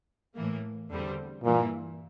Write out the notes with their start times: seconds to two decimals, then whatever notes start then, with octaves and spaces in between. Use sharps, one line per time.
0.36 A2 E3 A#3
0.90 E2 D3 G3 C4
1.44 G2 A#2 E3 A#3